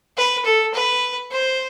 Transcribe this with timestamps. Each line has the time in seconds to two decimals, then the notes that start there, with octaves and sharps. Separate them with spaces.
0.17 B4
0.45 A4
0.74 B4
1.31 C5